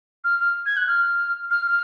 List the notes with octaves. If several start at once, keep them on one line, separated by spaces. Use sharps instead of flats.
F6
F6
G#6
F#6
F6
F6
F6